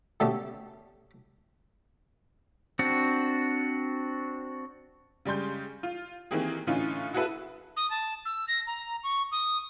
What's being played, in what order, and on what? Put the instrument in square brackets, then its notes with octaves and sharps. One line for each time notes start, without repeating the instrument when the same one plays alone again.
[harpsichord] B2 D3 A3 C#4 G4 A4
[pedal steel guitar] C4 D4 F#4
[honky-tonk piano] C#3 G3 G#3 C6 G6
F4
D#3 E3 A#3 C4 G4 G#4
A2 D3 E3 C#4 D#4 F4
E4 F#4 G#4 A4 B4 E5
[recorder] D#6
A5
E6
A#6
A#5
C#6
D#6